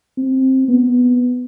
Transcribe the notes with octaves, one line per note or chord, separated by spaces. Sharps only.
C4
B3